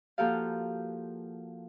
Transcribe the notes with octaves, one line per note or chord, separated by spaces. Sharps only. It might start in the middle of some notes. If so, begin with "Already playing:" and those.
F3 A#3 F#4 G4 A4 F5